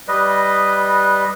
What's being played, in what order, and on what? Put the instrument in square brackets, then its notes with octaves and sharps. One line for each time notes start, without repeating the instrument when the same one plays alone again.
[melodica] G3 B4 D#5